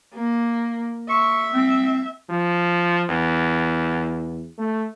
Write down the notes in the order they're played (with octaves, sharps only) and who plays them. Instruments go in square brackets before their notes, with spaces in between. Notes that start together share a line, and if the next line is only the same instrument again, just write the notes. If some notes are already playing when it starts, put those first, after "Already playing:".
[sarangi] A#3
[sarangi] E5 [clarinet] C#6
[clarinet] C4
[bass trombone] F3
E2
A3